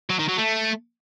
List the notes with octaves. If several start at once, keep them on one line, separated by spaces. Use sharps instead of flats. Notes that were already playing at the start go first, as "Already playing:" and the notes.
F#3
D#3
F#3
A3